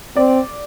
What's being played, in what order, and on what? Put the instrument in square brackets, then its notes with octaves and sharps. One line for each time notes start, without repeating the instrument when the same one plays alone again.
[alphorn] C4 [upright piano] D5